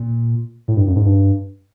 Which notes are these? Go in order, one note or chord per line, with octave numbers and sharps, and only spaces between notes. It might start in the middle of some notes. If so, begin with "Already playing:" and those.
Already playing: A#2
A2
G2
F#2
G#2
G2